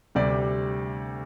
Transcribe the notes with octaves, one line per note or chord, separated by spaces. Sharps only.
D2 C3 G3 D5